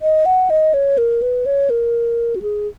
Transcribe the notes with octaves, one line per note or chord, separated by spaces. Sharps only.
D#5
F#5
D#5
C#5
A#4
B4
C#5
A#4
F#4
G#4